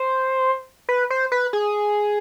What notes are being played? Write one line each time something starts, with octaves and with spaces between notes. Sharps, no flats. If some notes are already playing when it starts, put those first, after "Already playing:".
Already playing: C5
B4
C5
B4
G#4